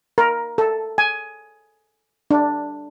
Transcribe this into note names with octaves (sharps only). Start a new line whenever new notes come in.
A#4
A4
G#5
D4